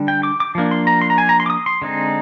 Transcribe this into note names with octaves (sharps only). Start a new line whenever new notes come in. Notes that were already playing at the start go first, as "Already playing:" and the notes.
Already playing: D3 G3 D4
G5
D6
D6
F3 A#3 D4
C6
A#5
C6
A#5
G#5
A#5
C6
D6
D#6
C6
D3 G#3 C4 D#4